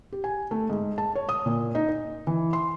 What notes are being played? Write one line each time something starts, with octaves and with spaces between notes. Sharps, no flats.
G4
G#5
A3
G#2
A5
C#5
D#6
A#2
D#4
D#5
E3
C6